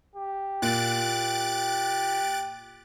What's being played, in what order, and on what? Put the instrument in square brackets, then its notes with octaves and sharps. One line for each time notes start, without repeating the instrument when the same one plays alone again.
[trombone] G4
[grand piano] A#2 [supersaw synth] F#6 A6 D7